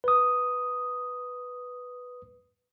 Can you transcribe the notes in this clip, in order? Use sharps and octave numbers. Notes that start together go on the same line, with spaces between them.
B4 D#6